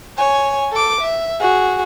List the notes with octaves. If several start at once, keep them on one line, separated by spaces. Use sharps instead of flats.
C#5 G#5
A4 D6
E5
F#4 G#4